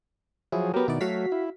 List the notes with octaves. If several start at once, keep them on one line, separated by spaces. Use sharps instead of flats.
F3 F#3 E4 G#4
F#3 B3 G4 A#4
B2 D#3 E4 D5
F#3 A3 F#4 F5 B6
E4